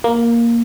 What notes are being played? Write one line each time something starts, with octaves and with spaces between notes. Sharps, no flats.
A#3